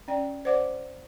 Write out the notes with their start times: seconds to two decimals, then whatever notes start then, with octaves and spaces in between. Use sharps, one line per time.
0.08 C#4 D5 G5
0.45 C5 D5 F#5 D6